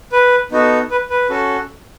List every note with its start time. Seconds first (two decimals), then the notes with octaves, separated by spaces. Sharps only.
0.12 B4
0.52 B3 D#4 F#4 A4
0.91 B4
1.10 B4
1.30 C#4 F#4 A4